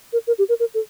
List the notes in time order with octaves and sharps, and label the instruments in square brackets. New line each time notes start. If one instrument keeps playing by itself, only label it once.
[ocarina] A#4
A#4
G4
A#4
A#4
A4